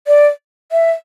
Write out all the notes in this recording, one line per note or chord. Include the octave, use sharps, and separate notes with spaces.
D5
E5